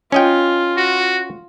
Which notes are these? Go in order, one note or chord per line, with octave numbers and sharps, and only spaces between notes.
C#4 F4 D#5 G5
F#4